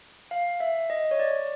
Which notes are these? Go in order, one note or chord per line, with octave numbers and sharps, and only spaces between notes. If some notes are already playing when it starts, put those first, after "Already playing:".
F5
E5
D#5
C#5
D5